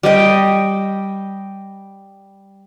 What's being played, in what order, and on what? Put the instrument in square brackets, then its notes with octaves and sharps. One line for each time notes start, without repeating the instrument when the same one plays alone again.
[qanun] G3 D#5 G5